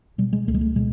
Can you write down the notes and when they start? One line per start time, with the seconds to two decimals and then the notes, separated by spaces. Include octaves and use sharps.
0.18 B2 G3
0.33 G#3
0.48 C#2 A3
0.54 G#3
0.61 A3
0.76 B2 G#3